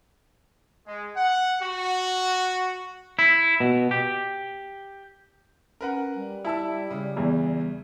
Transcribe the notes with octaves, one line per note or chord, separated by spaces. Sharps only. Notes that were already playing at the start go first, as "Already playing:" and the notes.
G#3
F#5
F#4
E4
B2
G4
C#4 A#4 B4 F#5
G3
E4 E5 A5 E6
C#3
E2 E3